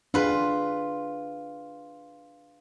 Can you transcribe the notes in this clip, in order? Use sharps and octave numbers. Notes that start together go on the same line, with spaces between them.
D4 F4 G#4 B4